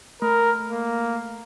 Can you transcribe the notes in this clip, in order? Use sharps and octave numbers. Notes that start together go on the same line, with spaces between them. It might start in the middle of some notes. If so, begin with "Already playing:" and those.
A3 A#4
A#3